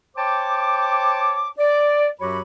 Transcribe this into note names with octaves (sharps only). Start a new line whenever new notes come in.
C5 C#5 G5 A5 D6
D5
F#2 F#3 F#4 G4 C#5 B5